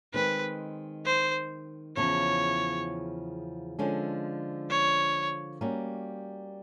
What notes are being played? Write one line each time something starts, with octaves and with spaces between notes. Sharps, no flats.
D#3 G#3 C4 B4
C5
E2 C#3 F3 C#5
D3 F3 G#3 C#4
C#5
G3 A#3 C#4 F#4